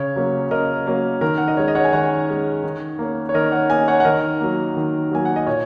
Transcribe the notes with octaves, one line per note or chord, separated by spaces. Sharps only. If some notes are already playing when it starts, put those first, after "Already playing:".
Already playing: C#3 C#5
F#3 A#3 C#4
C#3 A#4 D#5
F#3 A#3 C#4
D#3 A#4
F#5
D#5
G#3 C#4 C#5
D#5
C#5 F#5
G#5
D#3 C#5 F#5
G#3 C#4
D#3
A#3 C#4
C#5
D#3 A#4 D#5
C#5 F#5
A#3 C#4 D#5 G#5
C#5 F#5
F#5
D#3 A#4 D#5
F#3 A#3
D#3
F#3 A#3 G#5
F#5
D#5
A#2 C#5